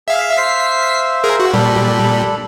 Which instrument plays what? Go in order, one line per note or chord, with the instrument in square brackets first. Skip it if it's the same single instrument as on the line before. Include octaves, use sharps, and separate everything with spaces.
[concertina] G#4 [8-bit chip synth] E5 F5
[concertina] C5 E5 F5 [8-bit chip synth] B6 C7
[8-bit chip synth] G#4 A#4
F#4
[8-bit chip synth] A#2 G3 [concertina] D4 A4 B5